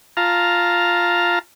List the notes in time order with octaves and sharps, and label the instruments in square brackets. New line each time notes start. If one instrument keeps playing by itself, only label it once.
[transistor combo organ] F4 F5 A5 A#5